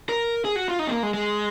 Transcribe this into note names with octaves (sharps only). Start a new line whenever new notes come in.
A#4
G#4
F#4
F4
D#4
C4
A#3
G#3
G#3